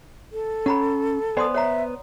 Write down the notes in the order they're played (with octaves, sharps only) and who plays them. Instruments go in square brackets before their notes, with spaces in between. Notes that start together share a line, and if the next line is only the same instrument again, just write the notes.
[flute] A4
[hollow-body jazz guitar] C#4 [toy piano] F#5 A#5 B5
[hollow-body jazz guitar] B3 C5 G#5 [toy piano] D5 C6 D#6
[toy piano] C#5 F#5 A#5 [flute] E5